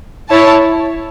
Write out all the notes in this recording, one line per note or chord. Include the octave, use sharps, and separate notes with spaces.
E4 C#5 A5